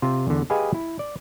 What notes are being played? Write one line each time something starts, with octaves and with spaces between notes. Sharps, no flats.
C3 F4
E2 D3
G4 G#4 B4 D#5 F5 G#5
E4
D5